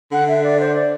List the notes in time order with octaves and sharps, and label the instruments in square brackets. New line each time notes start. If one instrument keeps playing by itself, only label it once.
[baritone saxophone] D3 [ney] F#5
[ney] E5
D5
C5
D5